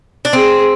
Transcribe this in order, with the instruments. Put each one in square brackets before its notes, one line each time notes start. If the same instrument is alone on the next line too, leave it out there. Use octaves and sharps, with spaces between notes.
[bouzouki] D4
[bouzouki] C4 [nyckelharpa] G#4